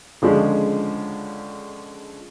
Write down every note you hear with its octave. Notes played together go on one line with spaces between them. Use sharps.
C#2 D3 F3 G#3 C#4